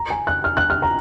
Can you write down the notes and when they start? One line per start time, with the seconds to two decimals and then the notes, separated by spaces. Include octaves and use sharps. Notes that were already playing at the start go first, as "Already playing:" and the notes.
Already playing: A#5
0.10 G#5
0.27 F#6
0.44 F6
0.57 F#6
0.70 F6
0.82 A#5